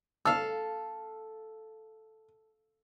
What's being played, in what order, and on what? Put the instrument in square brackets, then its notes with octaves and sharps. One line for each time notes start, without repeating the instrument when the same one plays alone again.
[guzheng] A4 F5 [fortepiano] E6